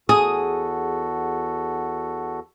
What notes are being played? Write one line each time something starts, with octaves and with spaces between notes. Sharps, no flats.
E2 F#4 G#4 A4 D#6